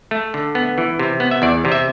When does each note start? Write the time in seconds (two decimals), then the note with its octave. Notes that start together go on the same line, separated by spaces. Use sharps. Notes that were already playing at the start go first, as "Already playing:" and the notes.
0.11 A3
0.34 D3
0.55 B3
0.78 E3
0.99 C3
1.20 B3
1.31 E5
1.42 E2 D5
1.65 C3
1.72 E5